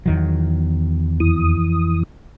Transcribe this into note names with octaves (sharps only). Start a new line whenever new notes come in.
E2 D#3 F#3
F2 E3 D#6